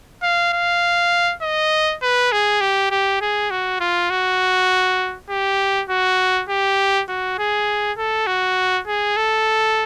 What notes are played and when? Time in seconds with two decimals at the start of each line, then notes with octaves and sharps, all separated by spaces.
0.23 F5
0.53 F5
1.42 D#5
2.03 B4
2.32 G#4
2.61 G4
2.91 G4
3.21 G#4
3.51 F#4
3.80 F4
4.10 F#4
5.30 G4
5.90 F#4
6.49 G4
7.09 F#4
7.39 G#4
7.98 A4
8.27 F#4
8.88 G#4
9.17 A4